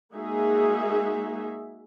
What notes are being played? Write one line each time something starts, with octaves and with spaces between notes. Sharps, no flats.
G#3 A#3 D#4 F#4 G#4 E5